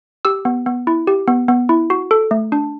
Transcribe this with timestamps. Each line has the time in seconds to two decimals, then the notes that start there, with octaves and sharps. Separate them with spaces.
0.25 G4 E6
0.45 B3
0.66 B3
0.87 E4
1.07 G4
1.28 B3
1.48 B3
1.69 E4
1.90 F#4
2.11 A4
2.31 A3
2.52 D4